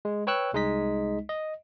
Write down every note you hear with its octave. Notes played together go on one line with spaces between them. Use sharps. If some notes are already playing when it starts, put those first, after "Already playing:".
G#3
B4 C#5 G5 C#6 E6 F#6
C2 G#3 D#4 D#5 B6
D#5